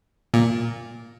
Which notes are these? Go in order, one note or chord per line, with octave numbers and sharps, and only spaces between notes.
A#2